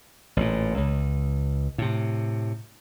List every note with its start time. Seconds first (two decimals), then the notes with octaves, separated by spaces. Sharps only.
0.37 A1 A#2
0.78 C#2
1.78 A2 C3